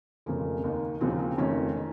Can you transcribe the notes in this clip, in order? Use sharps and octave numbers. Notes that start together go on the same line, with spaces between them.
F1 F2 C#3 A#3
D#2 D#3
D#2 C#3 F3 C4
A#3
C4
F1 F2 D#3 C#4
D#3